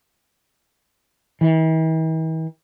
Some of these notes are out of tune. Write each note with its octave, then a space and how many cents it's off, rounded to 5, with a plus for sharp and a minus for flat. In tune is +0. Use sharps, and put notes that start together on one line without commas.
E3 -45